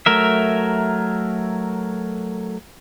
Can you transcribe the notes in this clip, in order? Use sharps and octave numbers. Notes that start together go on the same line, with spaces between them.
F#3 A3 A#4 E5